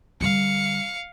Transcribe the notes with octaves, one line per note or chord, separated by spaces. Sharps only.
D3 G3 F5 C#7